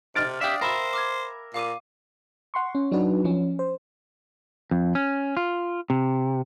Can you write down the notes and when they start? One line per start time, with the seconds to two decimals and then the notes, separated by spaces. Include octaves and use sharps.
0.15 C3 F6 A6 D7
0.41 D4 G4 E5 F5 G5 D#6
0.61 A#4 C5 E5 B5
0.93 D6 F6 G#6
1.54 A#2 F5 D6 D#7
2.54 F#5 C6 C#6
2.75 C#4
2.91 F#3 D4 D#4 F#4 B4
3.24 F3 C#4
3.59 C5
4.71 F2
4.95 C#4
5.37 F4
5.90 C3